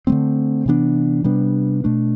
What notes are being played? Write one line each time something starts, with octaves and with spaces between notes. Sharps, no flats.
D3 F#3 A3 C4
C3 E3 B3 D4
C3 G3 B3 D4
B2 A3 D4